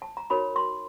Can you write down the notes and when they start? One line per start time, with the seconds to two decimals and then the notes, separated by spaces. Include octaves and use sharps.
0.02 A5
0.17 A#5
0.30 D#4 F#4 A#4 C#5 B5
0.56 C6